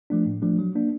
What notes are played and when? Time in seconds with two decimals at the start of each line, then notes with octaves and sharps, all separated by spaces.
0.10 F3 A3 D4
0.26 A2
0.42 F3 A3 D4
0.59 F#3
0.75 A#3 D4